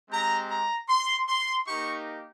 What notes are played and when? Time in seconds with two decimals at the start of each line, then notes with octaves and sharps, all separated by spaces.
0.10 G#3 C4 G4 A#5
0.49 A#5
0.89 C6
1.28 C6
1.67 A#3 D#4 G4 C#6